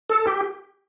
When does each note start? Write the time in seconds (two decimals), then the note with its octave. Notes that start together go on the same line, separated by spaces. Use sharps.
0.10 A4
0.27 G4